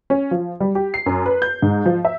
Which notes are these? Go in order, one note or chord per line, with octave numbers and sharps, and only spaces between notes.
C#4
F3
G3
G4
C7
F#2
B4
G6
G#2
F3
E5